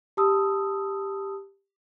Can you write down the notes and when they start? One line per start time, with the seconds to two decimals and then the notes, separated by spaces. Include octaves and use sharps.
0.17 G4 A5 B5 D#6 E6